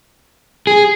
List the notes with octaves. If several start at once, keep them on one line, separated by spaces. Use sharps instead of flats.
G#4